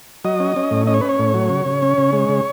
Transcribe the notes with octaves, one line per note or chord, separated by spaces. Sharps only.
F#3 D#5
C#4
C#4
A2
C#4 D#5
C#5
C#4 B4
C#5
A2
F#3
C#3
C#3
C#4
C#3
G#3
C#3